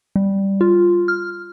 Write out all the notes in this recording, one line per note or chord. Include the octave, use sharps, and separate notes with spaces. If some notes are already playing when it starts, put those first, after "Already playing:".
G3
F4
F6